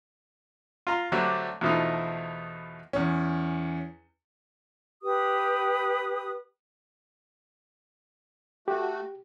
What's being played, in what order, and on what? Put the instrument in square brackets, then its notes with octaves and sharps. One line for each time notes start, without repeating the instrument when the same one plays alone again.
[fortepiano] F4 A#5 C6
D3 F#3 G3 A3 C4 D4
E2 B2 F3 A3 D#4
[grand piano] E2 C#4
[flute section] G4 B4 D#6
[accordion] A3 F#4 [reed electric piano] G4